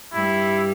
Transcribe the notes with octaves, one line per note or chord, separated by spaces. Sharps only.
G2 G3 E4